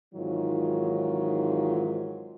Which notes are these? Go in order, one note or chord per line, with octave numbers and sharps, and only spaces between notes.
G#2 D#3 E3 F#3 C4 F4